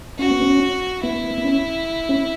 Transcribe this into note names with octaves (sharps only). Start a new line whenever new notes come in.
C#4 F#4
B3
C#4
B3 E4
B3
B3
C#4
C#4